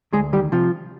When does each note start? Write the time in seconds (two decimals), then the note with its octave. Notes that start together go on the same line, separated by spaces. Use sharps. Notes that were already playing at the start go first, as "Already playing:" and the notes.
0.13 D2 G#3 G#4
0.33 D#3 G3 G4
0.52 C3 F3 F4